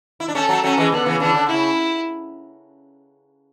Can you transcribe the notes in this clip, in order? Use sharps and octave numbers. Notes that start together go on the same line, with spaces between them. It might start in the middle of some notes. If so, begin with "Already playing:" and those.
E4
D4
A3 C#4 A4
F#3 A3
F#3 A3 C#4
E3 G#3
D3 B3
C#3 E3
C#3 E3 D4
D3
C#3 E4